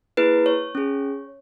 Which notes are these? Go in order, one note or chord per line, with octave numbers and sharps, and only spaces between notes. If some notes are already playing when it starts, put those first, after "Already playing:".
A#3 E4 G#4 B4
C#5
C#4 G#4